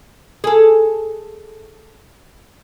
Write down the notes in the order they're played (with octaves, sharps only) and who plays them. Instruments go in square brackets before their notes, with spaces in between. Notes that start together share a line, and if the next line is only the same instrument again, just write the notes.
[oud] G#4 A4